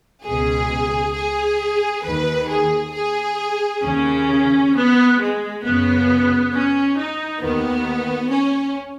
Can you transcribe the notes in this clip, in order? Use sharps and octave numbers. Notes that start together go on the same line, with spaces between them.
C#2 B2 G#4
G#4
D#2 D#3 B4
G#4
G#4
D#2 C#3 C#4
B3
G#3
F#2 C#3 B3
C#4
D#4
D#2 D#3 B3
C#4